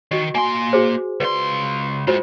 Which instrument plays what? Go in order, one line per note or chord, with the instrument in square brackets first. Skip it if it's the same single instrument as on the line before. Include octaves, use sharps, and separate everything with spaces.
[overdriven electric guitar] D#3 [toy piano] F#4 D#5
[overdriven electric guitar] A#3 C6 [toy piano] G#5
[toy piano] F#4 G#4 C5
[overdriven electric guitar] C#2 C6 [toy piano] B4 D5
[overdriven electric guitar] A2 G#3 [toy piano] F4 F#4 C5